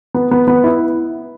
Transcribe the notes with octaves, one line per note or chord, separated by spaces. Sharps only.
B3
B3
B3
E4